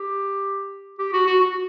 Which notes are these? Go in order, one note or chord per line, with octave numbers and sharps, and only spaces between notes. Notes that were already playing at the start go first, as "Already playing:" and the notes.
Already playing: G4
G4
F#4
F#4
F#4